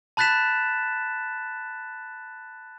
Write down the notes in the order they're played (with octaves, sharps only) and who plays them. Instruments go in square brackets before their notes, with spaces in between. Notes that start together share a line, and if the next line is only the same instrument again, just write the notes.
[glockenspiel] A5 B5 F#6 A6 B6 E7